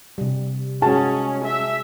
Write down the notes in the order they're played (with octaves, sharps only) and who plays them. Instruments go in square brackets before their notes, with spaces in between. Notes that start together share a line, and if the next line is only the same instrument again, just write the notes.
[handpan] C3 G3
[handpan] G#3 F#4 G#4 [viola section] C#4 [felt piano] A5
[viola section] E5